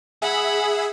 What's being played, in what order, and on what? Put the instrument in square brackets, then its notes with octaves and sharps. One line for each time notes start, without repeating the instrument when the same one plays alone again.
[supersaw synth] G#4 E5 [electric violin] F#5 B5